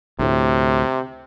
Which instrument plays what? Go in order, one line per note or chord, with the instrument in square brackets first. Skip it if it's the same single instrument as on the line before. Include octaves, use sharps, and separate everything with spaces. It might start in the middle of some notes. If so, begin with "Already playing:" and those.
[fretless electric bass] D2 A2 [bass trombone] C3